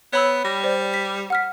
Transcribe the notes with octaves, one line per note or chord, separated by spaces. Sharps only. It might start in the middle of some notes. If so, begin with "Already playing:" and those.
B3 C#5 B5 E6
G3 A#6
C5 D5
B6
F#5 F6 B6